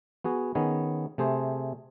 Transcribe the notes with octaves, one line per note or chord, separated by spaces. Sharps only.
B3 F#4 G#4
D#3 B3 C#4 G#4
C3 A3 G#4 C5